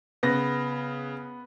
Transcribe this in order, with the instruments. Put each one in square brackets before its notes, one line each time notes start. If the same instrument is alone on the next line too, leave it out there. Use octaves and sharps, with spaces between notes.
[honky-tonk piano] C#3 [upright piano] B3 A#6